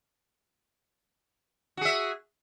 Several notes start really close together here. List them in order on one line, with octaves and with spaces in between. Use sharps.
F#4 G#4 E5